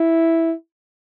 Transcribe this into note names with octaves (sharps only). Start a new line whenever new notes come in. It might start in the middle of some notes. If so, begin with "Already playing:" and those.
Already playing: E4